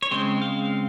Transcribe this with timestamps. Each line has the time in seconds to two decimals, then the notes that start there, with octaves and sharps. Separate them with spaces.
0.02 C#5
0.11 C#3 G#3 C4 C5
0.42 F5